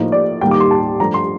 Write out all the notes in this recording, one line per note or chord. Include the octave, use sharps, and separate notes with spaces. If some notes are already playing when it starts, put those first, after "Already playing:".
Already playing: A2 F3 A#3 D#4
D5
D#2 D#3 G3 A#3 G5
D6
C6
A5
G2 F3 A3 D4 A#5
C6